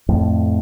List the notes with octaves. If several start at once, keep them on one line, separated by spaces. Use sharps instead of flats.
F2 A2